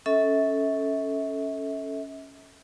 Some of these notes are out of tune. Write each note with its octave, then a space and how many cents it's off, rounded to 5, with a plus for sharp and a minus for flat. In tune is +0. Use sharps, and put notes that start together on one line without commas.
C#4 +0 A4 +0 E5 -40